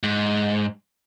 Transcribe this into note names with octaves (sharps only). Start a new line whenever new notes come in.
G#2